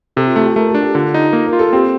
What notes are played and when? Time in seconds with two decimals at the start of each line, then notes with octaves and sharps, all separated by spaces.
0.16 C3 A4
0.27 F4
0.36 A3 G4
0.46 G4
0.56 A3 A#4
0.68 A4
0.75 D4
0.81 G4
0.95 D3 F4
1.14 D#4
1.33 A#3
1.46 A#4
1.53 F4
1.59 A4
1.73 C4 G4